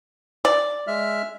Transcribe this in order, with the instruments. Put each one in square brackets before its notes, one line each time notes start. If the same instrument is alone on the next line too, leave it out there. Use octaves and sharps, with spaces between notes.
[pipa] D5
[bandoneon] G#3 E5 F6